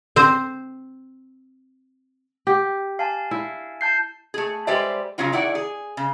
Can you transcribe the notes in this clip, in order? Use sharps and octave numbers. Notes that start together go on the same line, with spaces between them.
C4 C5
G4
F5 G#5 A5
E4
A5 G6 C7
A3 G#4
G3 G#3 B4 C5 D5 E5
C#3 F#3 C#4 F4 F#4
D#3 E4 G#4 D5 F#5
G#4
C#3